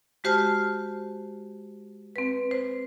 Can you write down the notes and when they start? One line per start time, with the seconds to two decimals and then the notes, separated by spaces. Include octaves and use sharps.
0.24 G#3 F#4 G4 C5 A5 F6
2.16 C4 B4
2.51 C5